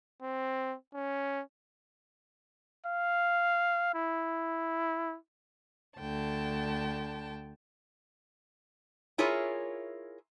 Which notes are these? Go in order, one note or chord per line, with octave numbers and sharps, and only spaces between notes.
C4
C#4
F5
E4
D2 D3 G5 A5
E4 F4 G#4 A#4 C#5